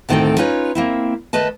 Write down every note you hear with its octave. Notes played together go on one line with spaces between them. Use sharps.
D2 A2 D#3 C4 A4 G5
C#4 D#4 F4 B4 C#5
A#3 C4 E4
D#3 A3 B4 D#5 A5